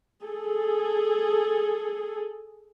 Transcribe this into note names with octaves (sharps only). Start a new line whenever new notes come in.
G#4 A4